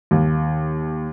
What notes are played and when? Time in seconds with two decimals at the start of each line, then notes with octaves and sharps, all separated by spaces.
0.11 D#2